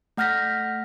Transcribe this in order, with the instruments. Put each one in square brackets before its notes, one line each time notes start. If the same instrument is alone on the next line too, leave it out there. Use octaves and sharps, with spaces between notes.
[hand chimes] A3 F#5 F6 G6 A#6 B6